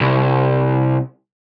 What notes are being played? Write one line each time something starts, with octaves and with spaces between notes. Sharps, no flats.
C2